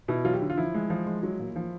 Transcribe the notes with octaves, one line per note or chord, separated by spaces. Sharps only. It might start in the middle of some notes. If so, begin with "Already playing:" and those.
B2 E4
F#3 F4
G4
D3
F4
F3 E4
G#3
F3
G#3
F#3
A#2
F3